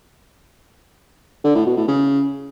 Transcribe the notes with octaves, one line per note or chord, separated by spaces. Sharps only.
D3
A2
B2
A2
C#3